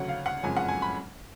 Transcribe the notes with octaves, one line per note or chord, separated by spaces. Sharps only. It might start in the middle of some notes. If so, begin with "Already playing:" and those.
Already playing: D2 C#3 F#3 C#4 F#5
F5
F#5
F#1 F2 C#3 G#3 C#4 G#5
F#5
G#5
B5